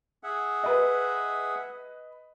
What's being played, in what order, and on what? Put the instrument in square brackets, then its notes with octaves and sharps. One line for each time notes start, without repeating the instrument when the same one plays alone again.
[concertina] G#4 E5 F#5
[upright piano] B4 D#5